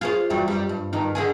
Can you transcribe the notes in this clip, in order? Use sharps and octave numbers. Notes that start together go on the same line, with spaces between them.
F4 G#4 C5
E2 F#3 G3
F#2 G3
G2
G2 D#3 D#4
D3 D#3 G#4